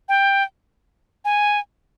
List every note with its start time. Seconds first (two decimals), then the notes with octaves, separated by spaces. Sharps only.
0.09 G5
1.25 G#5